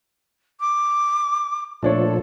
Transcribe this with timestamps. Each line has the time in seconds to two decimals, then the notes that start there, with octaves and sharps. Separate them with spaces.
0.60 D6
1.83 A#2 F3 A3 D4 A4 C#5